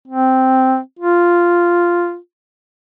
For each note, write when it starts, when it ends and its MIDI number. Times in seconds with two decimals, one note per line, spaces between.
0.08 0.78 60
0.99 2.16 65